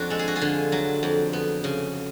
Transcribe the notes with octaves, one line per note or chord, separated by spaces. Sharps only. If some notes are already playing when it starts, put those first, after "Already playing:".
Already playing: F2 D4 F#4
G#3 A4
G#4
F#4
F4 G#4
D3
F#3
F2
B3
C#3